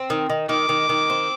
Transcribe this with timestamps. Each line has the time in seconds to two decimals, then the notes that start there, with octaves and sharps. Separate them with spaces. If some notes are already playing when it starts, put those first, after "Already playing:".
Already playing: C4
0.10 D#3
0.30 D#3
0.49 D#3 D6
0.69 D#3
0.89 D#3
1.10 C4